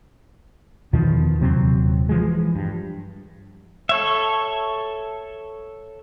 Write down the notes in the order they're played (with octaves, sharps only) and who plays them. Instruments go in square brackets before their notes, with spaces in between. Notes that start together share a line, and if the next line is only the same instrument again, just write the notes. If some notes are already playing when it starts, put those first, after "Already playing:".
[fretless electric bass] E2 B2 D#3 F3
D#1 C3 F#3 C4
E3 F3 G#3
G2
[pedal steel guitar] A4 C#5 E5